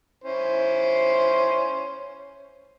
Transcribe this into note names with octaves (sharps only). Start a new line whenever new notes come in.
C#4 E4 C5